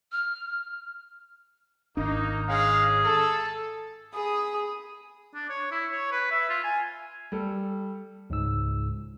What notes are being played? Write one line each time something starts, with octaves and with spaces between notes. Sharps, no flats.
F6
G#1 A#3 D4 D#4
G#3 C#4 G#4 F5
A4
G#4 B5 D#6
D4
C#5
E4
C#5
B4
E5
F4
G#5
G3 A4
C#2 G#2 E6